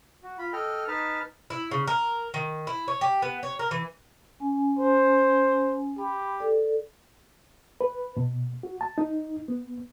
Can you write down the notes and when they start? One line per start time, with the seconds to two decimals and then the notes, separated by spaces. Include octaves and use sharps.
0.23 F#4
0.38 F4 B5
0.53 A4 D#5 G5 F6
0.88 D#4 B4 A5 F6
1.50 E4
1.71 C#3
1.87 A#4
2.34 D#3
2.67 E4
2.88 C#5
3.01 G4
3.22 B3
3.43 C#5
3.59 A#4
3.71 E3
4.40 C#4 G#5
4.79 C5
5.98 G4 B5
6.40 A4 D5
7.81 B4
8.17 B2
8.63 F#4
8.81 A5
8.98 D#4
9.48 B3